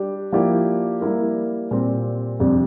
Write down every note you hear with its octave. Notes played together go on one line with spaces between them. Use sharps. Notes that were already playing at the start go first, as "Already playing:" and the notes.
Already playing: G3 D4 G4
F3 A#3 E4 G4 D5
G3 A#3 E4 A#4
A#2 G3 C4
F2 C3 G3 D4